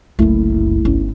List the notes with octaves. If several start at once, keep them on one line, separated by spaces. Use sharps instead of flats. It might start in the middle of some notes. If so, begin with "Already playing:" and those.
F#1 C2 F#2 A3 E4
G1 C#4 E4